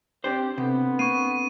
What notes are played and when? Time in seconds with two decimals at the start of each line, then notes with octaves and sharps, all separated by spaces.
0.24 C4 D4 G4 C5
0.58 C3 B3 C4 D4 A4
0.99 A#3 C#6 D#7